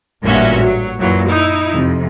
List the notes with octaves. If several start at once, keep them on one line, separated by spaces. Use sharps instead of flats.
A1 G2 A#2 C#4 F#4 E5
F#3
F#2 A#2 E3 F#3
D#4 E4
F2 C3